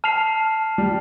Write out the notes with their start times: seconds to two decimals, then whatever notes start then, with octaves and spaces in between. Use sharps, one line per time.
0.04 A5 F6 C7 F7
0.78 G3